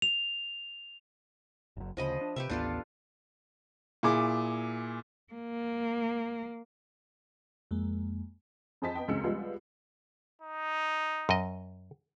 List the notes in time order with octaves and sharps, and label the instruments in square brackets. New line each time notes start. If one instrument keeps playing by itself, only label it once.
[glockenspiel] F7
[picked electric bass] F#1 F#2
[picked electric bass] D2 C#3 [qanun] F3 D#5 B5
[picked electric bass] D4
[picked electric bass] C3 [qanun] G4 B4 E5
[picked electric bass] A1 D#2 B3 [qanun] D4 F4 A4
[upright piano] A#2 E4 G#4 D6
[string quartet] A#3
[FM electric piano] F2 G#3 A#3
[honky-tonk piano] F2 G#4 C5 D#5 A5 B6
B3 D#5 G5
C#2 F#2 G#3 C4 E6 C#7
F3 G3 G#3 B3 F4
[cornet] D#4
[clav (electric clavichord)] F#2 D#5